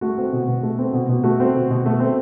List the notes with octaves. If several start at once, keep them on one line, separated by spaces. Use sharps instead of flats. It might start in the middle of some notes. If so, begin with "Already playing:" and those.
A3 F#4
C4
B2
B2
A3
C4
B2
B2
A3 F#4
C4
B2
B2
A3
C4